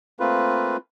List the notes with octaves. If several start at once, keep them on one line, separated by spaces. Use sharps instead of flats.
A3 A#3 C4 F4 B4